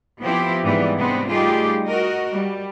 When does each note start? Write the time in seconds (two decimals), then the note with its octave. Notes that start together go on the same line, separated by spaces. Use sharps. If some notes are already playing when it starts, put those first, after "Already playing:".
0.23 F3 B3 C4 E4 G4
0.64 G#2 E3 G3 B3
0.96 C3 G#3 B3 C4 D4
1.29 G3 A3 D#4 F4 G4 G#4
1.85 F#4 A#4 D#5
2.32 G3